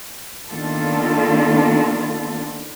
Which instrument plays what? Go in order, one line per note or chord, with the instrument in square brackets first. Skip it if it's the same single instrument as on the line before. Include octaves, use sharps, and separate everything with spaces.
[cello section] D#3 A#3 B3 D4 F4 A4